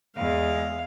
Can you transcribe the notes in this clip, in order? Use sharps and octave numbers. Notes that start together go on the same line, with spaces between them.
E2 G#3 F5